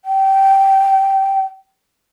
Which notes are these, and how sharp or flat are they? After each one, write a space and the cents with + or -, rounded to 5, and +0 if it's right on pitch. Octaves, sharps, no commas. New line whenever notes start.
G5 -15